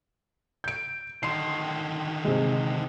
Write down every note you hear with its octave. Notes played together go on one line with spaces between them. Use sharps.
G6 D7
D3 D#3 C6 C7
C3 G#3